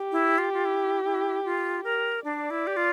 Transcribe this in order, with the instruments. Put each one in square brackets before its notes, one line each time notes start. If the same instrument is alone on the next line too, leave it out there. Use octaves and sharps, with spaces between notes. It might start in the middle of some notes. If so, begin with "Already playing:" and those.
Already playing: [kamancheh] G4
[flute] E4
F4
F4
E4
E4
F4
A#4
[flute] D4 [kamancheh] D5
[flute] E4
G4
F4